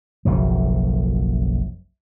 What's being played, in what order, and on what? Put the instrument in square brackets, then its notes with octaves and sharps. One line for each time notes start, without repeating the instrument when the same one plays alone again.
[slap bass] F#1 B1 F#2 F3